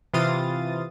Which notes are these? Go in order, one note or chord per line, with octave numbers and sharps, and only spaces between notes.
C3 E3 F4 D#6 A6